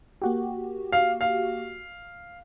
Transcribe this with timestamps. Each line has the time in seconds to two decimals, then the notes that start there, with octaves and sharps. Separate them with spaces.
0.22 A#3 F#4 G4
0.93 F5
1.21 F5